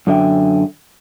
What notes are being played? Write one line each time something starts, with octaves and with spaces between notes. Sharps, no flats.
F#2 D3 E5 G5